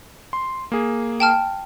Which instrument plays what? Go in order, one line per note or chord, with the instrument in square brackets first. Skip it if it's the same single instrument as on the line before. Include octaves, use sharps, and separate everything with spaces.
[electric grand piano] C6
A#3 G#4
[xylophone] G5 A5 F6